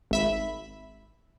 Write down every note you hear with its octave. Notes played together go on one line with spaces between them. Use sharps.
G#1 E5 B5